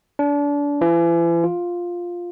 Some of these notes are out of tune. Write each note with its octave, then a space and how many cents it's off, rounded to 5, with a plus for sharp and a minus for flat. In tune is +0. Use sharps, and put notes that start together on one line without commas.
D4 -30
E3 +40
F4 +5